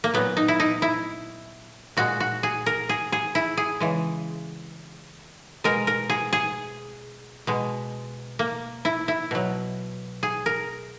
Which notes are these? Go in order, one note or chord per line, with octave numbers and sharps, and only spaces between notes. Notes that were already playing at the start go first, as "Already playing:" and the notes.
A#3
A#2 F#3 B3
D#4
E4
D#4
E4
A#2 G#3 F#4
F#4
G#4
A#4
G#4
G#4
E4
G#4
C#3 E3 G#3
B2 G#3 A#4
A#4
G#4
G#4
B2 G#3
A#3
E4
E4
B2 F#3
G#4
A#4